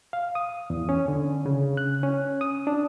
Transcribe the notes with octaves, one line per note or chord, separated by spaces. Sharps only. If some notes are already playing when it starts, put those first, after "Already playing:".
F5
D#6
E2
C#4
D3
C#3
F#6
C#4
D#6
D4